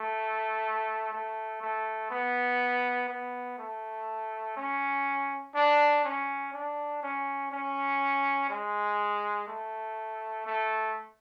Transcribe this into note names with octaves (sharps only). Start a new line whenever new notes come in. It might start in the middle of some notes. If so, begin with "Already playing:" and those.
Already playing: A3
A3
A3
B3
B3
A3
C#4
D4
C#4
D4
C#4
C#4
G#3
A3
A3